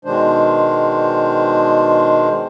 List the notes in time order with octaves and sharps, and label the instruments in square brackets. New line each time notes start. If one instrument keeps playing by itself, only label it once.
[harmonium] B2 D#3 G#3 D4 C5